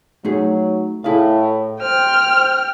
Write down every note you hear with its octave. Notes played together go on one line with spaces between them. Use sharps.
F#3 A3 D#4 G#4
A2 E4 G#4 F5
C5 G5 F6